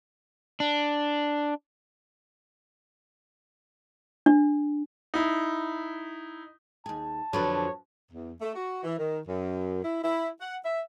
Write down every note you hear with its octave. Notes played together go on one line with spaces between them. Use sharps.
D4
D4
D#4 E4
D#2 G#4 A5
F2 D3 F3 F#3 B4 C#5
E2
A3
F#4
E3
D#3
F#2
E4
E4
F#5
E5